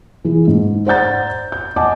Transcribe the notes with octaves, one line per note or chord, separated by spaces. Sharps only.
E3 G#4
G#2
C5 D5 F#5 A#5 G6 A6
G6
D#5 F#5 G#5 A5 D6